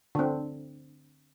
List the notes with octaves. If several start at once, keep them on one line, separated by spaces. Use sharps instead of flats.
D3 C4